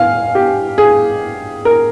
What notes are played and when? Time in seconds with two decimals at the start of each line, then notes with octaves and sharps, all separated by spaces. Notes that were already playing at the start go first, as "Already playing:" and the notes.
Already playing: F5 G#5
0.35 G4
0.78 G#4
1.65 A#4